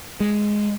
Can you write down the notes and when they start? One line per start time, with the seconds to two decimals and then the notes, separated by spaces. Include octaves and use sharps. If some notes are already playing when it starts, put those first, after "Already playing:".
0.20 G#3